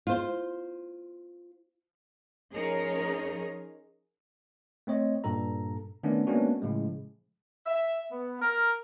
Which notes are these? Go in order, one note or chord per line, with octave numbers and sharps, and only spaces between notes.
F4 C5
F3 C#4 D#4 G#4 A#4 C#5
A3 C4 C#5 D#5
G2 A#2 A4 A#5
D3 D#3 A3 B3 C#4 D4
G#3 A#3 B3 C#4 D4 F#4
A2 C#3 F3 G#3
E5
B3
A#4